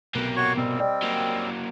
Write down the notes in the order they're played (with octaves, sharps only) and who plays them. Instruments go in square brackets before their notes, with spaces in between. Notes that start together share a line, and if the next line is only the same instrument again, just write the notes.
[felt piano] B1 [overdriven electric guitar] C3 A#3 [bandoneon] B4
[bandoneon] F#4 C#5 C#6
[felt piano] B2 [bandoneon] G3 C4
[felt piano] D5 D#5 G5
[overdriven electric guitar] F#3 A#3